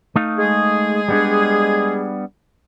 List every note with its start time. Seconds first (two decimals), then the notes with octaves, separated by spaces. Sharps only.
0.16 A3 D#4 F5
0.38 G#3 G#4
1.08 G3 B3 D4